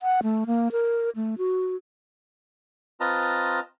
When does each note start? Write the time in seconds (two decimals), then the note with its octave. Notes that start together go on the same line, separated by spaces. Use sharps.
0.01 F#5
0.23 A3
0.47 A#3
0.72 A#4
1.16 A3
1.38 F#4
3.00 C4 F4 B4 D#5 A5 A#5